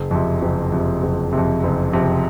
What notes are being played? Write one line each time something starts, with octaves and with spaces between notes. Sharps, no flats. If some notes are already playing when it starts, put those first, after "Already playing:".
Already playing: F#1
F2 C3
F#1
F2 C3
F#1
C3
F2
F#1
F2 C3